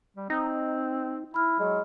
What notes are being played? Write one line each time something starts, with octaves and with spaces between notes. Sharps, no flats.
G3
C4 D#4
E4 B5 F6
F#3 G#3